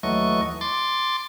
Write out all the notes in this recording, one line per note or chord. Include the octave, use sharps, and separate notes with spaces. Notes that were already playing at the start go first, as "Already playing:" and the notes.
D#2 E3 F#3 A3 D#5 C#6
C6 D6 A6